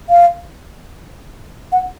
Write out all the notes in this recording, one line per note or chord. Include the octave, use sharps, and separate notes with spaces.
F5
F#5